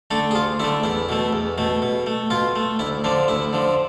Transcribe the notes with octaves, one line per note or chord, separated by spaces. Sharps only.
D3 A3 A4
G#4
D2 F4
D3 A3 E4
E2 E4
B2 A3
E2
B2 A3
B2
A3
B2 F4
A3
D2 E4
D3 F3 D4
D2 E4
D3 F3